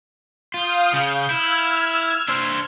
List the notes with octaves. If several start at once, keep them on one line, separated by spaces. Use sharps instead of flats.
F4 F5 D#6 G6
C#3 G6
E4 E6 F6 G#6
D4 C5